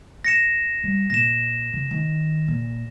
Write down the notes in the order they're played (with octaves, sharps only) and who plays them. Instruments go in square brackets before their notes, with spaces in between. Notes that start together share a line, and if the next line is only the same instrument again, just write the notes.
[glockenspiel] A#6 C#7 E7
[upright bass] G3
[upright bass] A#2 [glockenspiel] A#6 E7
[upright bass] C#3
D#3
A#2